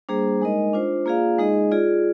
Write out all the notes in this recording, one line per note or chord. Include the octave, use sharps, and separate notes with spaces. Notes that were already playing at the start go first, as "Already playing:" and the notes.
G3 A#3 D4 G#4 C5
G#3 D#4 A#4 D#5
D4 F4 C5
A#3 F4 G#4 D5 F5
G#3 D#4 G#4 D#5
F4 G#4 D5